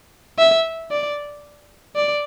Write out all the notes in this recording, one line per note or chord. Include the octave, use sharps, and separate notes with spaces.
E5
D5
D5